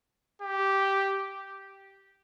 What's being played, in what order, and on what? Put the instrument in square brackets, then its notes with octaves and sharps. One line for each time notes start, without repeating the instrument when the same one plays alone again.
[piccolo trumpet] G4